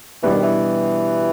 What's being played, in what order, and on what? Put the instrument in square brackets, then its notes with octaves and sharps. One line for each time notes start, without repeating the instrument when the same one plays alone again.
[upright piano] B2 G3 B3 D4 [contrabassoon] E3
[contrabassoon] D#3
E3